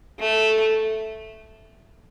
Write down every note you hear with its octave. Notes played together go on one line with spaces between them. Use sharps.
A3